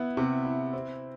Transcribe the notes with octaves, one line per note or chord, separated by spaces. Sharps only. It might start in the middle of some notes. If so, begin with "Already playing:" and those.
Already playing: B3 E4
C3
E4
C4